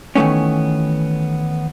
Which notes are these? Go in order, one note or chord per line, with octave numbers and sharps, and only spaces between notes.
D#3 E3 G3 A3 B3 C#4